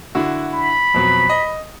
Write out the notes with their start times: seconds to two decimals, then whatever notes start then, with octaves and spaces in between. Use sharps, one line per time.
0.15 D3 E4 F#4
0.54 B5
0.94 F2 B2 F#3
1.29 D#5